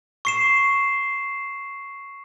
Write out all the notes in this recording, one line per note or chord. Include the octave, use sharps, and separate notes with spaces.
C#6 C7 E7